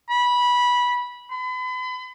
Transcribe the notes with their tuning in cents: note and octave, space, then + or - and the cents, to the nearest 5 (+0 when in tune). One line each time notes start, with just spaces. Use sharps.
B5 -15
B5 +40